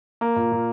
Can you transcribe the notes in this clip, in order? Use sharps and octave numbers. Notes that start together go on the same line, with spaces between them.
A#3
A#2
A#2